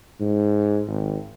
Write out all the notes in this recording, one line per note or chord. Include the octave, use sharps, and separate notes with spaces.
G#2
G#1